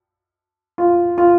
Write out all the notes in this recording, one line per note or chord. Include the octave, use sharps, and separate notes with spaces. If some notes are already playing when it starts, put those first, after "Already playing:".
F4
F4